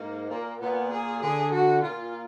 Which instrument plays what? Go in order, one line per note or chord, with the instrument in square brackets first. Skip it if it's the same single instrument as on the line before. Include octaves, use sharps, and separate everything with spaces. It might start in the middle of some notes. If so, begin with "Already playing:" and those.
Already playing: [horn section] G#2 [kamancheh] A#3
[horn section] A#2 [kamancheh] A#3
[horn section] A#2 [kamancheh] B3
[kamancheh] G#4
[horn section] D3 [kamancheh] G#4
[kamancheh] F#4
[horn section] A#2 [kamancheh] F4